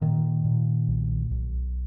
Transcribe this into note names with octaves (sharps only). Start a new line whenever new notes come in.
A#2 D#3
A#2
B1
B1